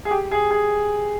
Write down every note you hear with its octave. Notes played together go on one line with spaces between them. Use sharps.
G#4
G4
G#4
G#4